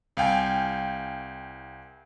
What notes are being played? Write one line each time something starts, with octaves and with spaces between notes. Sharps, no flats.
C2 F5 G5 G#5